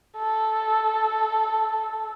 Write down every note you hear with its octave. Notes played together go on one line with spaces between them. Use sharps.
A4